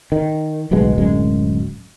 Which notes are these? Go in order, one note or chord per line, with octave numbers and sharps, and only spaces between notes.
D#3
D1 B1 B2 G#3
D1 F#2 G#3